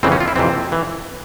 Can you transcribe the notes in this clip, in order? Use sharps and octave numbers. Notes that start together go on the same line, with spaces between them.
F2 C#3 E3 C4
C#4
F4
E4
F2 C3 E3 C4
E3